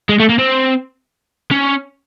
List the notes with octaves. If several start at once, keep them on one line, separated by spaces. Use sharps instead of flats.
G#3
A3
A#3
C4
C#4